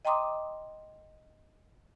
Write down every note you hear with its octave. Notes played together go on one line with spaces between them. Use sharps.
D#5 G5 A#5 C6 D6 D#6